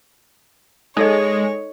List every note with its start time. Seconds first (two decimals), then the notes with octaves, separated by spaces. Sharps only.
0.97 G#3 D#4 A4 C#5 D#5